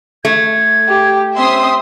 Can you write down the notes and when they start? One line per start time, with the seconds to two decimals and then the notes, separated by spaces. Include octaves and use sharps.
0.25 A3 G#6
0.88 G4
1.37 C4 C#4 E5 C6 D#6